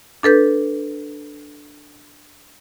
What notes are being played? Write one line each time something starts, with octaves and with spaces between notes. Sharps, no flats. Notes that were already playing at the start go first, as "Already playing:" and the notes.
D4 A4 B4 G6